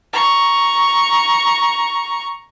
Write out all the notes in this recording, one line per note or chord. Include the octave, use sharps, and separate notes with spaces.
A#5 C#6